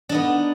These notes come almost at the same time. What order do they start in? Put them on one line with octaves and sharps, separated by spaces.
D4 D#4 B3